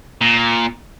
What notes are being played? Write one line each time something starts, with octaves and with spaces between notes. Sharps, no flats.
A#2